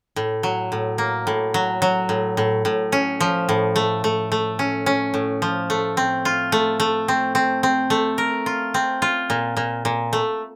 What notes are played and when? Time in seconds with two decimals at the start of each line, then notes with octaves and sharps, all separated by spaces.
0.16 A2
0.43 F#3
0.72 A2
0.98 A#3
1.27 A2
1.54 F#3
1.82 F#3
2.09 A2
2.37 A2
2.65 A2
2.92 C#4
3.20 F3
3.49 A2
3.76 A3
4.04 A3
4.32 A3
4.59 C#4
4.86 C#4
5.14 A2
5.42 F3
5.70 A3
5.97 C4
6.25 F4
6.52 A3
6.80 A3
7.08 C4
7.35 C4
7.63 C4
7.90 A3
8.18 A#4
8.46 F4
8.74 C4
9.02 F4
9.30 A#2
9.57 A#2
9.85 A#2
10.13 A3